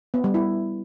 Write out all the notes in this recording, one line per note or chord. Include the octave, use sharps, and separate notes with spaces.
B3
G3
E4